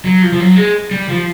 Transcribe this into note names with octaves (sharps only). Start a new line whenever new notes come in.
F#3
F3
F3
F#3
G#3
G3
F3